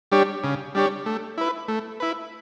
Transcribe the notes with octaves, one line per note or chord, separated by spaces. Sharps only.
G3 D4 G4 C#5
C#3
G3 D4 G4 C#5
A3
E4 B4
A3
E4 B4